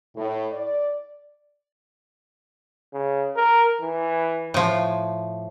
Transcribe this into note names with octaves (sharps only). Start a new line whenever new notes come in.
A2
D5
C#3
A#4
E3
A2 F3